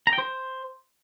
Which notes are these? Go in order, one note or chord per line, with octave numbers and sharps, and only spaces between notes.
A#5
G5
C5